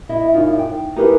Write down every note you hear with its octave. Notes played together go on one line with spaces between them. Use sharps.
E4 D#5 E5
F#2 D#4 F4
G5
D#4 E4 G4 G#4 A#4 B4